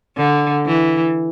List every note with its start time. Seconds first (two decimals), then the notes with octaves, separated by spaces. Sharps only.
0.16 D3
0.66 E3